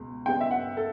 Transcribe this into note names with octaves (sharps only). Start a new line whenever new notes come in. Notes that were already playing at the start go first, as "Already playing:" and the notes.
Already playing: C#2 B2
C#3 G3 B3 D4 G5
E5
F#5
A4